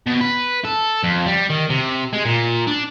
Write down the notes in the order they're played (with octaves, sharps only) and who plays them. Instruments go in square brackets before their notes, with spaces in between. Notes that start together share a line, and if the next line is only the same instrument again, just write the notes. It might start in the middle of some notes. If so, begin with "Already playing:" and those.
[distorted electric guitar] B2
B4
A4
F2
G3
D#3
C3
G#3
A#2
D4